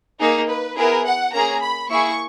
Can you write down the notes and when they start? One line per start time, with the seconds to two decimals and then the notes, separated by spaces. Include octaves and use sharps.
0.19 A#3 D#4 G#4
0.48 B4
0.76 B3 E4 G#4 A#4
1.04 F#5
1.32 A#3 C#4 G#4 A#5
1.61 B5
1.89 A#3 E4 G#4 C#6